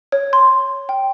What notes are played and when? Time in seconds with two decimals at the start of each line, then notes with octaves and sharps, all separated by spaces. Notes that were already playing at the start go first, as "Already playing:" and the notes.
0.12 C#5
0.33 C6
0.89 G5